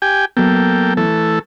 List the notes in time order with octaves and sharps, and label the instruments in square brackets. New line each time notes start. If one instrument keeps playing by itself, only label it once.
[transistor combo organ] G4 G5 G#5
[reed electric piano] F#3 B3 [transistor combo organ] A#3 A4 G5
[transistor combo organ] E3 A3 A4